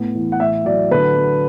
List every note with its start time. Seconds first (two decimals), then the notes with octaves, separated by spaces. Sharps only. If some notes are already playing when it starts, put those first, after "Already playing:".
Already playing: A2 B3
0.15 E3
0.32 F#5
0.40 A2 E5
0.65 F#3 D5
0.91 D3 B4
1.16 F#3